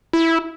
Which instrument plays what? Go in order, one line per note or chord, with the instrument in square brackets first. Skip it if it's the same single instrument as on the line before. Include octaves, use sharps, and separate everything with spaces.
[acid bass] E4